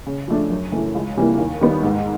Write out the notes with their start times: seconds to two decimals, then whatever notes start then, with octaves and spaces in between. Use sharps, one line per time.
0.06 C#3
0.28 F3 A3 D4
0.50 F#2
0.72 C#3 E3 A3
0.95 C#2
1.17 C3 E3 G3 A#3
1.38 D#2
1.61 D#3 G3 B3
1.83 G#2